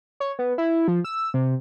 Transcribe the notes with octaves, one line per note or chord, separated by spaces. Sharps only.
C#5
B3
E4
F3
E6
C3